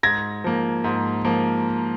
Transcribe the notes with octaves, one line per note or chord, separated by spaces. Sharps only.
G#2 G#6 A#6
F3 A#3
G#2
F3 A#3